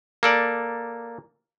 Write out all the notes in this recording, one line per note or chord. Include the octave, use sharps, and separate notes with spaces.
A#3 A4 D5